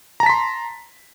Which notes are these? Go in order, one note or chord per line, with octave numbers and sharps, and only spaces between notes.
A5 A#5 C6 B6